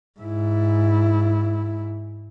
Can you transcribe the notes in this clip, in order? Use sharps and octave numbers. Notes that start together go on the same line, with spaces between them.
G#2 E4